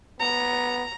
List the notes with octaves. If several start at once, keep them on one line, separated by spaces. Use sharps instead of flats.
B3 A#5